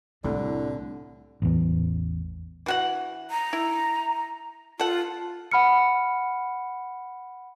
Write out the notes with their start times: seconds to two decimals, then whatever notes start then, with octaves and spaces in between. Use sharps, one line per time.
0.24 C2 A2 D3 D4
1.42 A1 E2
2.66 E3 F#4 F#5
3.31 A#5
3.53 E4
4.80 F4 A4 F#5
5.51 F#5 B5 F6 C#7